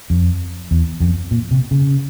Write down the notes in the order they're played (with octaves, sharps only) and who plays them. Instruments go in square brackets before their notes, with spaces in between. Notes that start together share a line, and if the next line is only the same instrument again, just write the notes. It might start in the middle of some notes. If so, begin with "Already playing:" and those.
[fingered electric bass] F2
E2
F2
A#2
C3
C#3